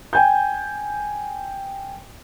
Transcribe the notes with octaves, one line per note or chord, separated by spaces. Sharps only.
G5 G#5 G6